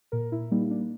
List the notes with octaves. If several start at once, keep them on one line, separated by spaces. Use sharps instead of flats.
A#2 A#4
E4
G3 A#3 D#4
D4